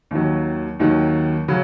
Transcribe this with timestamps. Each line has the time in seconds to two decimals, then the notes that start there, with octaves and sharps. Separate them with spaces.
0.11 D#2 D#3 F#3
0.79 D#2 D#3 F#3
1.48 C#3 F#3